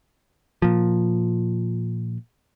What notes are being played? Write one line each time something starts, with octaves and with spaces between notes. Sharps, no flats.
A#2 F3